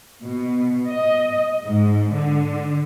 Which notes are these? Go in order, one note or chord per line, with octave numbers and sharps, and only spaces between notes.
B2
D#5
G#2
D3